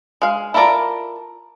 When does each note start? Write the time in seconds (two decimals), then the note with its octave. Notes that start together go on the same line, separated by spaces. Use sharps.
0.22 G#3 F5
0.54 E4 F4 A4 A#4 D5